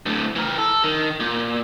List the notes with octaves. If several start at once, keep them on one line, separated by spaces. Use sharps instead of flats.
D2 A2
E3 A#4
A4
D#3
A#2